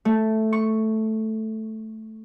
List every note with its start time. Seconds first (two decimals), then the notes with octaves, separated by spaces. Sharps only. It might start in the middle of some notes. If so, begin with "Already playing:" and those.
0.05 A3
0.53 C#6